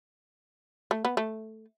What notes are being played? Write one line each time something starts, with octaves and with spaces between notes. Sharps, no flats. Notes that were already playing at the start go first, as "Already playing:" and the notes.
A3
B3
A3